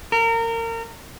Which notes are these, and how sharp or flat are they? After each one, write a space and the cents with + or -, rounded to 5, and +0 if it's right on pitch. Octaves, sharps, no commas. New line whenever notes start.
A#4 -30